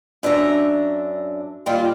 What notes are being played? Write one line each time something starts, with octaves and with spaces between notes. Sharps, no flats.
F#2 D4 E5 A#5
A#2 D#3 G3 F4